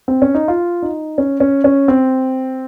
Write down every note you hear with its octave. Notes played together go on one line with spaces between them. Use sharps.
C4
C#4
D#4
F4
D#4
C#4
C#4
C#4
C4